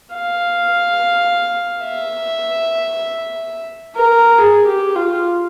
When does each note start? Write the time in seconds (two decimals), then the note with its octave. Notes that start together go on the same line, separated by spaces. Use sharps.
0.15 F5
1.85 E5
3.96 A#4
4.38 G#4
4.66 G4
4.95 F4